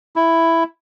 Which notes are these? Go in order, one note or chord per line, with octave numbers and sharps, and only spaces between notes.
E4